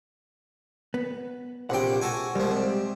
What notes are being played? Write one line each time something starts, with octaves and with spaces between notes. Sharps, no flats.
B3
A#1 C3 D5 F#5 G5
F#4 A4 G#5
C2 F3 G3 G#3
C3